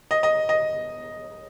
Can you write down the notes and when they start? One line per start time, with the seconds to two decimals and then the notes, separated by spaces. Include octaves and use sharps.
0.11 D#5
0.23 D#5
0.49 D#5